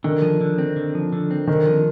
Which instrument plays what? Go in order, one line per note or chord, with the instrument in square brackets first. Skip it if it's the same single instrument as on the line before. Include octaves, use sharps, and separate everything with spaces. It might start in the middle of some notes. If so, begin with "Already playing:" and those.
[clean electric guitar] D3 [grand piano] D#3
[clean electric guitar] F3
D3
C4
D3
F3
D3
C4
[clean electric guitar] D3 [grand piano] D#3
[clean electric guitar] F3